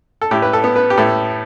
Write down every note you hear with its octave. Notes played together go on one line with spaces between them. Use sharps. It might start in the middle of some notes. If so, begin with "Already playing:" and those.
A4
A2 G4
B4
A4
B3
B4
G4
A2 A4